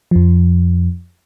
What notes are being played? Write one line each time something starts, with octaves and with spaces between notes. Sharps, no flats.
F2 F3